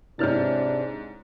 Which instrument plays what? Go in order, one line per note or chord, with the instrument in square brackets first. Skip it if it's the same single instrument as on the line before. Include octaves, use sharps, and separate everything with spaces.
[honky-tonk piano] G#2 F6 A6 [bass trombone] C3 [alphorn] D4 [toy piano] E4 B4 C#5